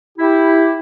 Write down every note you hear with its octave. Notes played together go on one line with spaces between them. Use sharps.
E4 G4